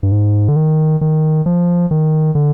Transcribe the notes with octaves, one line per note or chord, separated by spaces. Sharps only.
G2
G#2
D3
D#3
D#3
F3
D#3
D3